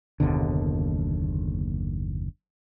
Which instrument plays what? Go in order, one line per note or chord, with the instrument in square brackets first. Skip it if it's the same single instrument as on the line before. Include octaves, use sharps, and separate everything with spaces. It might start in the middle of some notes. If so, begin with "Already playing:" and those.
[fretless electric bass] F#1 D#2 B2 D3